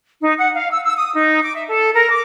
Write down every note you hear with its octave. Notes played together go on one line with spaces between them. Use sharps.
D#4
F#5
F5
E6
E6
D#6
D#4
D6
E5
A4
A#4
D6